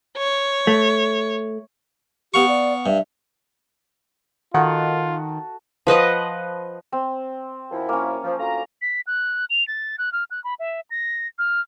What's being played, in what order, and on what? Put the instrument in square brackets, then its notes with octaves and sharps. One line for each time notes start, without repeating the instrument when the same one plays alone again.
[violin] C#5
[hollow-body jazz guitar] A3
[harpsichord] B3 F5 C#6 [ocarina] G4
[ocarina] D5
[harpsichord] G2 [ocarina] E5
[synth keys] D#3 [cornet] F4 [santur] F#4 A4 [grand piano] F#5
[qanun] F3 B4 D#5 F#5
[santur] C4
[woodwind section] F#2 F3 E4
[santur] A#3 C#4
[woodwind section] F3
D2 F4 A#5
[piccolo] B6
F#6
F7
A6
F#6
F6
F#6
B5
E5
A#6
F6